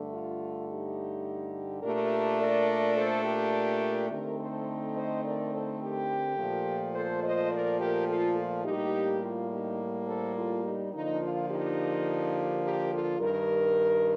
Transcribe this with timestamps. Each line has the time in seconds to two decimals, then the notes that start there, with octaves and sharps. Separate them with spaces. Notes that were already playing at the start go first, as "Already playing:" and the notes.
Already playing: G2 D3 A3
0.12 F4
0.68 D#4 G4
1.82 A#2 A3 D4 G4 A#4
2.39 A#4 D5
2.96 A4 C5
3.24 G4 A#4
4.09 D3 A3 C4 D#4 G4 A#4
4.38 A4 C5
4.95 C5 D#5
5.24 A#4 D5
5.53 A4 C5
5.81 G4 A#4
6.37 A#2 F3 A3
6.94 A4 C5
7.23 C5 D#5
7.51 A#4 D5
7.79 G4 A#4
8.08 F4 A4
8.37 F4
8.65 A2 G3 A#3 D#4 G4
9.22 F4
9.50 D#4 G4
10.07 A4 C5
10.35 F4 A4
10.64 D#4 G4
10.92 D3 F3 A#3 D#4
11.21 F4
11.50 D#4 G4
12.63 G4 A#4
12.92 F4 A4
13.20 G2 D#3 G3 G4 A#4